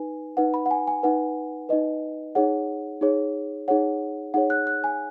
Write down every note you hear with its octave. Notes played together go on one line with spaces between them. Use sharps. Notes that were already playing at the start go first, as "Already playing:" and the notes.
Already playing: D#4 B4 G#5
D#4 B4 F#5
B5
F#5
G#5
G#5
D#4 B4 F#5
D#4 B4 D#5
D#4 G#4 C#5 F#5
D#4 G#4 C#5
D#4 G#4 C#5 F#5
D#4 G#4 C#5 F#5
F#6
F#6
G#5